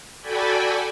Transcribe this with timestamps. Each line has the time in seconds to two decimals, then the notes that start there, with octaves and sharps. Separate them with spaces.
0.22 F#4 A4 D5 G5 G#5 B5